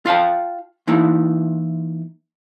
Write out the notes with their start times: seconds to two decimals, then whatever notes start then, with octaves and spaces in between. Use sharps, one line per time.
0.06 F4 F5 G5 A5
0.87 E3 A#3 D#4 E4